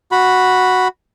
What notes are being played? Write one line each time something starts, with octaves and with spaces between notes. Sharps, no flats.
F#4 B5